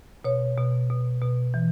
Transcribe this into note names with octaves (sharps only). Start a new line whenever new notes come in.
B2 C#5
B2
B2
B2
E3